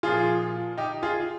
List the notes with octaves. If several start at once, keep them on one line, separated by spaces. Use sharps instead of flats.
A#2 F3 F4 G#4
D#4 G4
F4 G#4